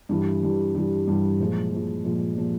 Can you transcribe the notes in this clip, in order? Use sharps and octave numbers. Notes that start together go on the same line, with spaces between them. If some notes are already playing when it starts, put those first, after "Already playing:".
G2 E3 G3
G2 E3 G3
G2 E3 G3
G2 E3 G3
A#2 F3 G#3
A#2 F3 G#3
A#2 F3 G#3
A#2 F3 G#3